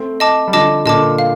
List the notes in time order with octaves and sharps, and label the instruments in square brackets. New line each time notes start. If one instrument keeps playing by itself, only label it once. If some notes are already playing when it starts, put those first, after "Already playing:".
Already playing: [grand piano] A3 C4
[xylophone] D#5 A5 D6
[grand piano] G3
[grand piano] D3 F3 [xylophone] D#5 A5 D6
[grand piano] A#2 D3 [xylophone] D#5 A5 D6
[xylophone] F5